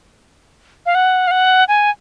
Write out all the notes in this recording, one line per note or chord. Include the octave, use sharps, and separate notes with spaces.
F5
F#5
F5
F#5
G#5